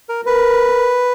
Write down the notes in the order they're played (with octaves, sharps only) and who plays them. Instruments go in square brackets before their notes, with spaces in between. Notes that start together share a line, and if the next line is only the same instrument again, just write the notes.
[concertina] A#4
[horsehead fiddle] A#4 [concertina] B4